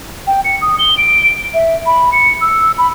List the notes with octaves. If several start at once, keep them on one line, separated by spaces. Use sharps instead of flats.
G5
C#7
D#6
G7
D7
E5
B5
C#7
E6
B5